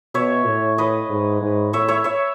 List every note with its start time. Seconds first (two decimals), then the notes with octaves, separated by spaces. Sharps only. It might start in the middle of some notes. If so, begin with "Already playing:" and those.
0.14 B2 C#5 E5
0.46 A2
0.78 B4 D#5
1.09 G#2
1.42 G#2
1.73 A2 C#5 E5
1.88 C#5 E5
2.04 C#5 E5